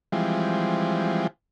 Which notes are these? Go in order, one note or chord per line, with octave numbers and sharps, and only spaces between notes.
E3 F3 G3 G#3 C4